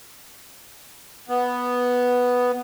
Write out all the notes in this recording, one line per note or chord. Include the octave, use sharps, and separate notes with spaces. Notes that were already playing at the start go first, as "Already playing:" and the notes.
B3